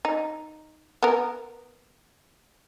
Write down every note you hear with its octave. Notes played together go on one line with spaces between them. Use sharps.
D#4
B3 A#4